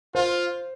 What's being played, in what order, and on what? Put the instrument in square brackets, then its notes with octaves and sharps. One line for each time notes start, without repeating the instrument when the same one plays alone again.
[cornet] F4 [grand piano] C5